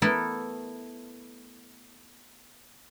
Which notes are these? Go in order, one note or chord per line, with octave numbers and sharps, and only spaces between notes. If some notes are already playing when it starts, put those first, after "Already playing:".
A3 B3 E4 A4 A#4